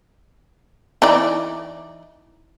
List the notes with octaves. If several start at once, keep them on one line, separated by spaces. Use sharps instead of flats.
E3 D#4 D5